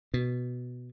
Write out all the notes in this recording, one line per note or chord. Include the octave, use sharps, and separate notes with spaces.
B2